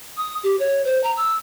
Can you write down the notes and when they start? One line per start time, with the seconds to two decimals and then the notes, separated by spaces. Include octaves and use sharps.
0.17 D#6
0.43 G4
0.59 C#5
0.85 C5
1.04 A#5
1.17 E6